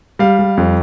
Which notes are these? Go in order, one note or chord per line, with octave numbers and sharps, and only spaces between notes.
G3 F5
G3
F2